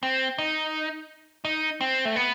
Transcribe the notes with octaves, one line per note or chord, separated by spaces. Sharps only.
C4
D#4
D#4
C4
A3
B3